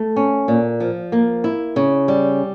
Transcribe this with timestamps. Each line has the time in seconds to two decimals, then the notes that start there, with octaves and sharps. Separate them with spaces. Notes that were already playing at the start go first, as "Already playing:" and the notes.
Already playing: A3
0.16 C#4
0.48 A#2
0.80 F3
1.12 A#3
1.44 E4
1.76 C#3
2.08 G3